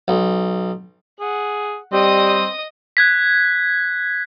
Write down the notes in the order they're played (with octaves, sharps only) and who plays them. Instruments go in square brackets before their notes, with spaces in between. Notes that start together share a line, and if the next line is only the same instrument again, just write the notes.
[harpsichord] B1
[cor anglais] G#4 [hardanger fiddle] F#5
[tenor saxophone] G3 [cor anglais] C4 [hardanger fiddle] D#5 D#6
[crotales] F#6 G#6 B6